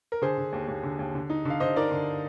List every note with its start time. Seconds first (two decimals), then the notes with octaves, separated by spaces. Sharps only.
0.12 A#4
0.22 D3 G#4 C5
0.38 D3
0.53 D#2
0.68 D#2
0.83 D3
0.99 D#2
1.15 D3
1.30 D#4
1.45 D3 F5
1.60 D3 C5 D#5
1.76 D#4 A#4 D5
1.91 D3